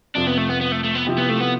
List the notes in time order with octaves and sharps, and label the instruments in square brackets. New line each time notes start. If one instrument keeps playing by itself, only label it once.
[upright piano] F2 C3 F3 [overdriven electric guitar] D4
[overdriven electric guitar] B3
A3
B3
B3
A3
A3
B3
[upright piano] C3 F3 C4 E4 G4
[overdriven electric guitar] B3
A3
B3